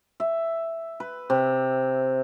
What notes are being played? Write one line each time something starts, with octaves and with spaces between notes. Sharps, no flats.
E5
B4
C3